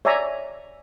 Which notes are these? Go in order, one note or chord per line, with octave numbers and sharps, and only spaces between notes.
C#5 D5 E5 G#5 A#5